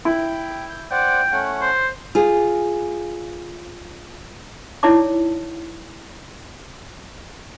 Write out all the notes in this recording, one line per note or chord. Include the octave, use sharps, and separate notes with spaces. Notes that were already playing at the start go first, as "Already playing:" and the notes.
E4 G5
G6
C5 D5 F#5 G5
A3 C#4 F#5
C5
F4 G#4
D#4 E4 C#5 D5 A5 D6